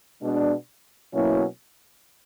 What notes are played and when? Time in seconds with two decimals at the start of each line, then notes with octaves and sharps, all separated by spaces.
0.21 B2 G#3 B3 D4
1.12 B2 F#3 A#3 C#4 E4